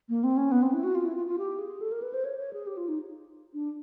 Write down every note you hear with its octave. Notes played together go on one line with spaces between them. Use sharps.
A#3
C4
C#4
B3
C4
E4
F#4
F4
E4
F4
F4
G4
G#4
A4
A#4
B4
C5
C#5
C#5
G#4
G4
F4
D#4
D4